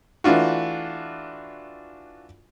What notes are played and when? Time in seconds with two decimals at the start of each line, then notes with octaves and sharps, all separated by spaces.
0.24 E3 A3 D4 F4 F#4